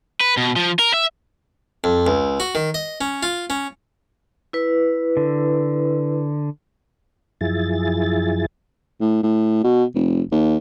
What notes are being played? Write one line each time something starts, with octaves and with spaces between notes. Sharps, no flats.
B4
B2
F3
A#4
E5
F2
C#2
F#4
D#3
D#5
C#4
F4
C#4
E4 B4
D3
F#2 F3 E4 G#4 A6
A2
A2
B2
F1
D#2